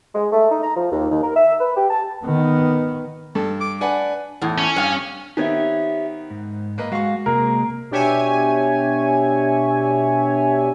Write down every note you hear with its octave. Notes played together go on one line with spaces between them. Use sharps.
G#3
A3
D#4
A#5
F3
D#2
D#2
A#4
E5
B4
G4
A5
D#3 B3
G2 A4
D6
D4 B4 F#5 G#5
E2 A2
C#4
G2 F5
D#3 B3 C4 G4 C#5 E5
G#2
A#3 B4 D#5
G#3 F#4 F5 C#6
C3 G#3 A#3 A#4
B2 D4 G4 C#5 E5 G#5